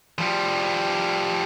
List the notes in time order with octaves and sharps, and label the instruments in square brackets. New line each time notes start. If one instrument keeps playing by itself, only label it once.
[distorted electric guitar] F3 G3